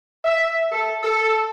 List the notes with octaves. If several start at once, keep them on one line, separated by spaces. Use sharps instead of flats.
E5
A4
A4